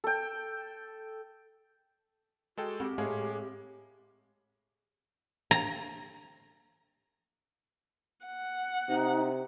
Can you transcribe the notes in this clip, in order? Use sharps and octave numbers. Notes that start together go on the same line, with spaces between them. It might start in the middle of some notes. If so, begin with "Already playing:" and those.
A4 G5
G#3 F#4 A4 G5
C4 F#4 G4
A2 G#3 G#4 F5
A#5
F#5
C3 D#4